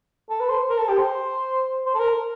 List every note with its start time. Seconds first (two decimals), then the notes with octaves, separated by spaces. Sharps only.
0.30 A4
0.40 B4
0.50 C5
0.69 A#4
0.78 A4
0.89 G4
0.98 C5
1.86 C5
1.95 A4
1.99 A#4